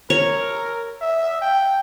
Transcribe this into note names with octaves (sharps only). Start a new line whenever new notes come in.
A#4 C#5
E5
G5